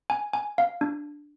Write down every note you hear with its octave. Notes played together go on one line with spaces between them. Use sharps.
G#5
G#5
F5
D4